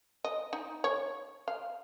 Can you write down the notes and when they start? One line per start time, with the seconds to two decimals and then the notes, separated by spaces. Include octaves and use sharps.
0.24 D#5
0.53 D#4
0.84 C#5
1.48 F5